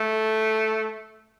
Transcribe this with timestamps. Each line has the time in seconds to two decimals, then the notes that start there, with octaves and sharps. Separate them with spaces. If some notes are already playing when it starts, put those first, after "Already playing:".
Already playing: A3